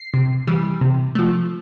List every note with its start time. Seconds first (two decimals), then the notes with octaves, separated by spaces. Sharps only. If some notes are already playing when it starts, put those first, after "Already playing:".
Already playing: C7
0.14 C3
0.47 E3 G3
0.81 C3
1.15 F3 A3